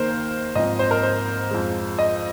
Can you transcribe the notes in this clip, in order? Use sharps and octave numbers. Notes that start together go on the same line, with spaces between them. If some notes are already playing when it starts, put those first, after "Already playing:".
Already playing: D#2 D#3 A#3 D#4 A#4 C5
G#2 F3 C4 D#5
C5
A#4
C5
F2 F3 G#3
D#5